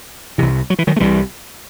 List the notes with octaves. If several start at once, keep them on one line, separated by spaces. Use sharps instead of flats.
C2 C3 E3
F#3
E3
D#3 F#3
A3
C2 C3 E3 G3